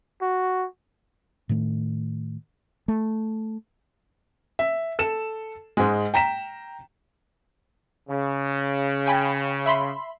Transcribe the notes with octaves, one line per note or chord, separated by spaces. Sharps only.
F#4
A2 D#3 A3
A3
E5
A4 E7
G#2 G#3
G5 A#5 B6 E7
C#3
G5 G#5 B5
E5 B5 C6